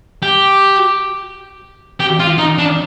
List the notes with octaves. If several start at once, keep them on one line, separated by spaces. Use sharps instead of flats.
G4
G4
F4
D#4
D4